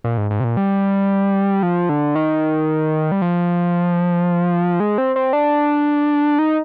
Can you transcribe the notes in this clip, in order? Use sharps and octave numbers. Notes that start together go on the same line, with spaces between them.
A#2
G#2
G#2
C3
A#2
G3
F3
D3
D#3
G3
F3
G#3
C4
C4
D4
D#4